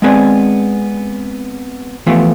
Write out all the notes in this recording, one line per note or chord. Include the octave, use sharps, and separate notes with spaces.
G#3 B3 C4 G#4 B4 D5
E3 F3 A3 B3 F4 G4